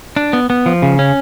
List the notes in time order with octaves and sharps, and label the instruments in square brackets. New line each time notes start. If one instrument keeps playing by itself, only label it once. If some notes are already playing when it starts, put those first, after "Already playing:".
[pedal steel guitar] D4
B3
B3
F3
C#3
C#4